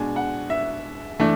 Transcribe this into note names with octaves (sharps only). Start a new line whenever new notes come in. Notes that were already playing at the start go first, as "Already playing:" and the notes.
Already playing: B2 G#3 D4 G#5
F#5
E5
E3 A3 D4